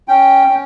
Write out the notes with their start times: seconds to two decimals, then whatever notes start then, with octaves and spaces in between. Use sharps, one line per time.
0.08 C#4 G5
0.47 C#4